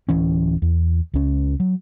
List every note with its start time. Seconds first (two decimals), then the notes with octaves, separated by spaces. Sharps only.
0.09 D1 E3 C#4
0.62 E2
1.14 C#2 C#4
1.60 F#3